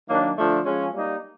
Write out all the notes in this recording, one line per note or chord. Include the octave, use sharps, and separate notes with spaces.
D#3 F#3 A#3 D4
D3 F3 A3 D4
F3 G#3 C#4
G3 A#3 D#4